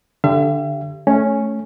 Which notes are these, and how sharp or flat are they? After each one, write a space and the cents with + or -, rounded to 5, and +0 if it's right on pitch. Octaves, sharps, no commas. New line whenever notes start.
D3 +0 G4 +0 E5 +45
A3 -10 C#4 +0